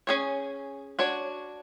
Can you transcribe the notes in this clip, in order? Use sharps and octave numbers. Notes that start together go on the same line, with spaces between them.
C#4 G#4 C#5
D4 F#4 C#5